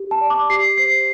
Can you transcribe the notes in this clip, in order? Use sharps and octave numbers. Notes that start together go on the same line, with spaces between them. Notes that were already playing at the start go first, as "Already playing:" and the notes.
Already playing: G4
A5
D5
D6
G4 C7
C5 C7